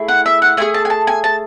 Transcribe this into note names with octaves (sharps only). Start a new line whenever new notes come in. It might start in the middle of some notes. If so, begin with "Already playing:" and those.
Already playing: A3 E4 G#4
F#5
E5
F#5
A3 E4 G#4 G#5
A5
G#5
A5
G#5
A5